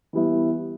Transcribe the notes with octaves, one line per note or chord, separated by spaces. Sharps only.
E3 G3 B3 E4